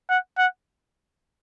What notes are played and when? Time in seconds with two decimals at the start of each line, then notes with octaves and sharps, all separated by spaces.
0.09 F#5
0.38 F#5